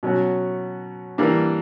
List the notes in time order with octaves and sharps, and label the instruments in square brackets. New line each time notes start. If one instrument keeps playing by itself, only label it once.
[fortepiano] B2 F#3 C#4 F#4
E3 G3 A#3 D4